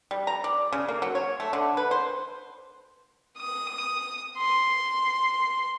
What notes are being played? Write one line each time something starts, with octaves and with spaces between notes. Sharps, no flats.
G3
A#5
D5
C#3
A#3
F#3
C#5
A3
D3
B4
C5
D#6
C6